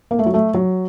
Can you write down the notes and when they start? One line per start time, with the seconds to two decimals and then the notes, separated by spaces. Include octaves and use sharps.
0.11 A#3
0.19 A3
0.26 F#3
0.34 A3
0.54 F#3